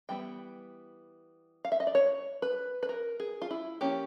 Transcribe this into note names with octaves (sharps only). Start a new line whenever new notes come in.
E3 G3 B3 G5
F5
E5
D#5
D5
C#5
B4
B4
A#4
G#4
F4
E4
F3 A#3 C#4 G4